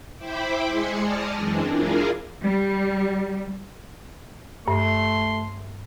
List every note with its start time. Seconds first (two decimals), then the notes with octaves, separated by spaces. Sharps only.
0.18 E4 C5 E5 G5 B5 D6
0.66 G#3 G#5 C6 C#7
1.00 D5 A5 D#6 F6 A#6
1.36 F#2 E3 G#3 C4 D4
1.68 D4 E4 F4 G#4 A#4 F5
2.43 G3
4.68 G2 A3 C6